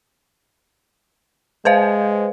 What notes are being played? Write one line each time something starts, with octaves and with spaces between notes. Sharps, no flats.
G#3 B4 C5 F5